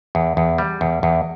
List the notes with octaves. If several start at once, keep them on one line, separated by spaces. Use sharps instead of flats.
E2
E2
G3
E2
E2